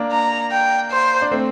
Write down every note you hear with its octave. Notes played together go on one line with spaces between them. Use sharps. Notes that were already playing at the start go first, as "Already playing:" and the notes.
Already playing: A#3 D4
A#5
G5
C5
D4
A3 C4